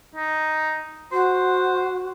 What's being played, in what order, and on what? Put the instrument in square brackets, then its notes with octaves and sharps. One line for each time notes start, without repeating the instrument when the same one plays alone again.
[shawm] D#4
[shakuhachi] F#4 [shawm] C5